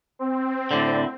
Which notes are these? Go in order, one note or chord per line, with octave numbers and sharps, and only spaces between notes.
C4
A2 D3 D5